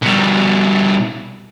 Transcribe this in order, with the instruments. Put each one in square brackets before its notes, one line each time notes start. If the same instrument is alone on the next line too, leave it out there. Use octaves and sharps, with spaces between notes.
[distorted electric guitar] B2 G3